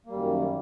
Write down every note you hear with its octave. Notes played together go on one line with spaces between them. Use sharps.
F#2 D#3 G3 A#3